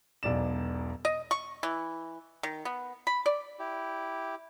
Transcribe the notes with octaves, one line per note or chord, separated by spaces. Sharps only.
E1 B1 D5 E7
D#5
C#6
E3
D#3
B3
B5
D5
E4 G4